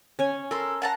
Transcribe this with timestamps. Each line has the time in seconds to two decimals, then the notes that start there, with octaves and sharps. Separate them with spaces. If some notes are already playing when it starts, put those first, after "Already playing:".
0.19 C#4 C#5 G#5
0.51 A4 A#4 C6
0.82 F#5 A5 A#5